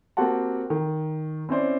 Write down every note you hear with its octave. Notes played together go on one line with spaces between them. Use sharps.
A#3 C4 F#4 G4 F#5 A5
D#3
C4 C#4 E4 C5 D5